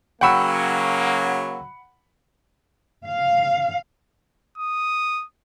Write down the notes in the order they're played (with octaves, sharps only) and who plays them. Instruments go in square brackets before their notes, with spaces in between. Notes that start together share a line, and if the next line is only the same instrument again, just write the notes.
[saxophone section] C#3 F#3 [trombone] A#3 [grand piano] F#5 B5 [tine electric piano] G5 C#6 E6
[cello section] F5
[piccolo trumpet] D#6